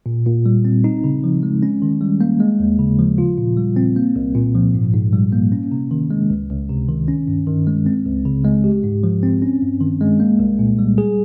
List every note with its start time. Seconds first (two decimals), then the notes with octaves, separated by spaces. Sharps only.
0.06 A#2
0.26 A#2
0.46 G3
0.65 C4
0.84 D#4
1.04 C#3
1.24 F3
1.43 G#3
1.63 C#4
1.82 D#3
2.01 G3
2.21 A#3
2.40 G#3
2.60 D#2
2.79 C#3
2.99 F3
3.18 F4
3.38 A#2
3.57 G3
3.76 C4
3.96 A#3
4.16 C2
4.35 A#2
4.55 F3
4.74 G#2
4.94 G#2
5.13 G3
5.33 A#3
5.52 C#4
5.72 C3
5.91 D#3
6.11 G#3
6.30 C#2
6.50 C#2
6.69 C3
6.89 D#3
7.08 C#4
7.27 G2
7.47 D#3
7.67 G#3
7.86 C4
8.05 C#2
8.25 C#3
8.45 G#3
8.64 G4
8.84 G#2
9.04 F3
9.23 C4
9.42 C#4
9.62 G2
9.81 D#3
10.01 G#3
10.20 A#3
10.39 C2
10.59 A#2
10.79 G3
10.98 G#4